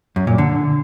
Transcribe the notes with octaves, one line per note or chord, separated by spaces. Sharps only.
F#2
A#2
D3